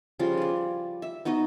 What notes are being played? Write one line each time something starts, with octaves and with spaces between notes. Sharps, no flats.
C#3 F3 G3 F4
B4 D5
E5
B3 D#4 F#4 D#5